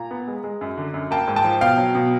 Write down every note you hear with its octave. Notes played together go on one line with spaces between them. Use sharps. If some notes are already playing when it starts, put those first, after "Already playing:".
Already playing: A#2 A#5
B3
G#3
G#3
F#2
D3
F#2
A#3 G5 A5
G#2
G5 A5
F3
B2 F5 G5
F#3
B2